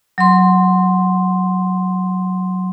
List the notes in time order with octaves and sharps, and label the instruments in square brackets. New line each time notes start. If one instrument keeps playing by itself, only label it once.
[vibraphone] F#3 C6